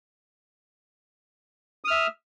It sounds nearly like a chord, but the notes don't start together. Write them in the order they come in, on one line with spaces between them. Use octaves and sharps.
D#6 F6 E5